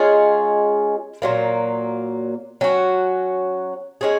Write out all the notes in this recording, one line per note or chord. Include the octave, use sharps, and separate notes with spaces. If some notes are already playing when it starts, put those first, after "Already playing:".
Already playing: G#3 C#4 F4 G#4
A#2 F#3 A#3
F#3 C#4 F#4
G#3 C#4 G#4